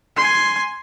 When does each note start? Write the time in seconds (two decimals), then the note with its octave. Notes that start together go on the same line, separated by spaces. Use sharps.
0.17 G#5 C6